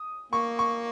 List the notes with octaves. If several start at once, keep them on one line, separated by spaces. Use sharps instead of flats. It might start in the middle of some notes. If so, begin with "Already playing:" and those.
Already playing: D#6
A#3 C#6
C#6